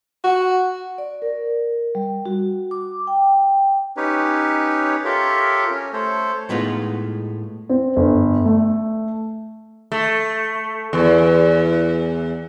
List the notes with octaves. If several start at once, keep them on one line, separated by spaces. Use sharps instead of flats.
F#4
D5
A#4
G3
F#4
D6
G5
C#4 D#4 G4 B4 C#5
F4 G4 A4 A#4 C#5 E5
C#4
A3 A4 C5 C#5
A2 G#3 B3 D#4 F4
C4
G1
A3
A3
E2